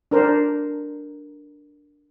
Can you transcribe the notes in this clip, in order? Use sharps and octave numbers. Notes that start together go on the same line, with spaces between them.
D4 A#4 C5